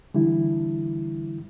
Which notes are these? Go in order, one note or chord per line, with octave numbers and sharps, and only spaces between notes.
D3 E3 G3 E4